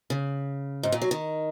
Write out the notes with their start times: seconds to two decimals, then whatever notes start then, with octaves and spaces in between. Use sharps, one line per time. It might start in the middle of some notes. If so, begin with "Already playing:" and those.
0.10 C#3
0.83 G#2
0.92 A#2
1.02 F#3
1.11 D#3